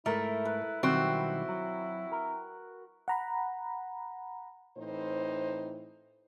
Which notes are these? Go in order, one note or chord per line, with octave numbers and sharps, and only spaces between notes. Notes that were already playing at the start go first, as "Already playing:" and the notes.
G#2 A3 E4 A#4
B4
B1 D#3 G3 C4 E4 F#4
F#3
A#4
F#5 A#5 B5
A2 E3 C4 D#4 C5